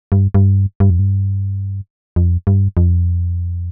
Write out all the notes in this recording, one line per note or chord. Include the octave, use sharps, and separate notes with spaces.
G2
G2
G2
F2
G2
F2
G2
F2